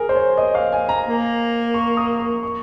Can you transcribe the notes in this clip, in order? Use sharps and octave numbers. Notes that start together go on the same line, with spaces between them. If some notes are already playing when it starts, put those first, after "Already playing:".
Already playing: G#4 A#4
C5
C#5
D#5
F5
G#5
A#5
A#3
C#6
D#6
C#6
C#6